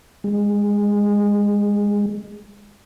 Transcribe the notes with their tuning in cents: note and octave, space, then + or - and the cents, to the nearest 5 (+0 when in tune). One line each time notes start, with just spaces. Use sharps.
G#3 -20